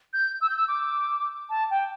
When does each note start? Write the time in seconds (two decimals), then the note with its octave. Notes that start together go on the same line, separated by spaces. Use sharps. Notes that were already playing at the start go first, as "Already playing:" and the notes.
0.13 G6
0.41 E6
0.49 G6
0.57 E6
0.68 D6
1.50 A5
1.70 G5